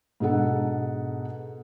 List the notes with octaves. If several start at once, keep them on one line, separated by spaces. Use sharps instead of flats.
G#2 B2 D4 A4 F#5